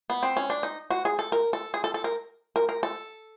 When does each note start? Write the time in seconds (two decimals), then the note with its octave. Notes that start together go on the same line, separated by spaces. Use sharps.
0.10 B3
0.23 C4
0.37 C#4
0.50 D4
0.63 D#4
0.90 F#4
1.05 G#4
1.19 A4
1.32 A#4
1.53 A4
1.74 G#4
1.84 A4
1.94 A4
2.04 A#4
2.56 A#4
2.69 A#4
2.83 A4